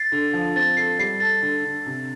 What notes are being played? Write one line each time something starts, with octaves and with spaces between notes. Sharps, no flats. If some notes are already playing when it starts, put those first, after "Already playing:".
Already playing: A6 C7
D3
F3
C4 A6
A4 C7
G3 C7
A4 A6
D3
D3
C3